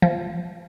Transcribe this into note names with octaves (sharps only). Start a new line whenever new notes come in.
F3